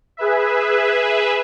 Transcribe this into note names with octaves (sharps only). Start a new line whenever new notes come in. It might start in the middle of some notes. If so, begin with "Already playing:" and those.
G#4 B4 E5